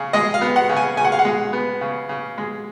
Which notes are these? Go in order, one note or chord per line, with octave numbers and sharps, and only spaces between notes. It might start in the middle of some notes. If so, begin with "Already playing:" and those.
Already playing: C#3 G#4
G#3 D#5
F5
B3
F#5
C#3
G#5
C#3 G#5
F#5
F5
F#5
G#3
B3
C#3
C#3
G#3